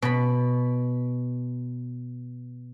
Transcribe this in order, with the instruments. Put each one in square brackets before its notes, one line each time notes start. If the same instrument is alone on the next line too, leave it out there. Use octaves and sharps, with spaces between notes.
[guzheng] B2 B5